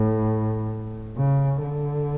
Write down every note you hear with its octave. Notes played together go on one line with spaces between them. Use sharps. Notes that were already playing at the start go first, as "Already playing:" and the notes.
Already playing: A2
C#3
D3